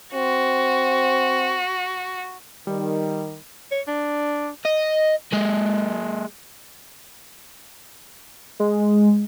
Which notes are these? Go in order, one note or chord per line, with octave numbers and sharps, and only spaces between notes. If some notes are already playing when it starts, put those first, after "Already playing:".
C4 F#4
D#3 G3
C#5
D4
D#5
G#3 A#3
G#3